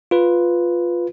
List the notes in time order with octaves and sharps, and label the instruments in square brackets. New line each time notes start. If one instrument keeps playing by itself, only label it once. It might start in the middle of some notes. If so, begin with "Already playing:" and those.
[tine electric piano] F4 B4